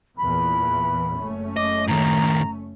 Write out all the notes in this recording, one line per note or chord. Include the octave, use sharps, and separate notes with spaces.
E2 A#2 E3 B5
F#1 A3 C#4
D#5 D6
A2 D#3 A#5